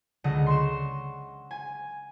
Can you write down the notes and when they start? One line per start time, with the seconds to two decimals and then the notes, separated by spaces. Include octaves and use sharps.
0.24 C#2 D3 D#5 F#5
0.46 C6 C#6 E7
1.51 G#5